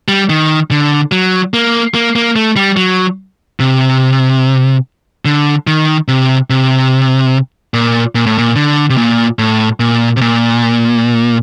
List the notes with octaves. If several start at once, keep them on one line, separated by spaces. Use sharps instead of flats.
G3
D#3
D3
F#3
A#3
A#3
A#3
A3
G3
F#3
C3
D3
D#3
C3
C3
A#2
A#2
A2
A#2
D3
C3
A#2
A2
A#2
C3
A#2